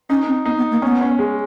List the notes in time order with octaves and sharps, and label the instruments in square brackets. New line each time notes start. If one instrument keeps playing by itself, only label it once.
[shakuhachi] C#4 [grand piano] D#4
[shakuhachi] C4
[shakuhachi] B3 [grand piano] D#4
[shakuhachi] B3
A#3
[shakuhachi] B3 [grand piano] C#4
[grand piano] C#4
G#3